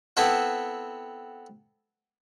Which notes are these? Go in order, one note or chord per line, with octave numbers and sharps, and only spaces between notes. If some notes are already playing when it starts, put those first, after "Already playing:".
B3 C4 E4 A4 C5 F#5